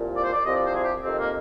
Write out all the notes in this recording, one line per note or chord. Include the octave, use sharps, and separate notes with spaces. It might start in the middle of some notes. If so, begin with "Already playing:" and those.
Already playing: C2 A#2 F3
D5
C5
D5
C2 C3 F3 D#5
D5
C5
G#4
G4
F2 C3 D#3 C4
A#3